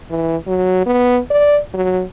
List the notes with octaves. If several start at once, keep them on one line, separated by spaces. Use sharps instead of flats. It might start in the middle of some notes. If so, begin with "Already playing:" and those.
E3
F#3
B3
D5
F#3